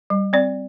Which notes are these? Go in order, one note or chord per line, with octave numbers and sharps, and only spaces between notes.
G3
C4 D5